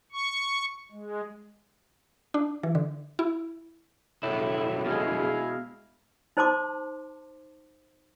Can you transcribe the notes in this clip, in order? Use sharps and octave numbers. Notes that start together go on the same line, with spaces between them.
C#6
G#3
D4
E3
D3
E4
B1 F2 A2 E4
B2 G#3 E4 G#4 F5
D#4 C5 A5 C6 D6